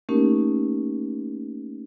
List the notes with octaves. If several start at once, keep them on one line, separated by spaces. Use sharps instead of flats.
A3 A#3 C#4 D#4 G4 A#4